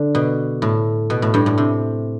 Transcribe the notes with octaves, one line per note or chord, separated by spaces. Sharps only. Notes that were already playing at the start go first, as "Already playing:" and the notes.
Already playing: D3
B2
A2
B2
A2
G2
A2
C3